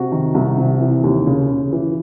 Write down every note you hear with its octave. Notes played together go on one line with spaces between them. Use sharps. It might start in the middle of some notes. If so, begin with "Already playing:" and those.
Already playing: C3 F#4
D#3
C2
C3
E3
D#2
C#3
C#3
E3